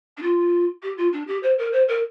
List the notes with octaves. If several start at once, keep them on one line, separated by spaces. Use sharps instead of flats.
D4
F4
G4
F4
D4
G4
C5
A#4
C5
A#4